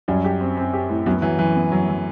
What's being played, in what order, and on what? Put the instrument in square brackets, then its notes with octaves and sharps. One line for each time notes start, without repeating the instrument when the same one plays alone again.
[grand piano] F#2 F#3 [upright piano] G3
[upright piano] G4
C4
C4
G4
A2
[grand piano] F#2 F#3 [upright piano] B3
[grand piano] E3 [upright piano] F#3
[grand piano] E3 [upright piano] F#3
[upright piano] B3
F#3
F#3